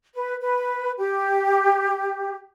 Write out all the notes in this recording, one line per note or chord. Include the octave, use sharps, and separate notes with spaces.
B4
B4
G4